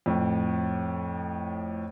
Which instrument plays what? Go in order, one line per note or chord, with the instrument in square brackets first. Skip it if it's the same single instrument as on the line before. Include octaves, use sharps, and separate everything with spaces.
[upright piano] F2 A2